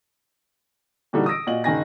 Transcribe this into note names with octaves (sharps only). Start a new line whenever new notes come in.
A#2 D3 E3 G3 D#4 F#4
D#6 E6 A#6 D7
A#2 F#4 D#5 F#7
F#1 D#3 G#5 A#6